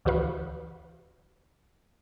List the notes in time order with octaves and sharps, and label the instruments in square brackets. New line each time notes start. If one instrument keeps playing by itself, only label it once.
[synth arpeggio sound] D2 E3 F#4 B4 F5